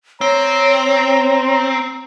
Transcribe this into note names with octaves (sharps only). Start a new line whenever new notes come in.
C4 C#5 A#5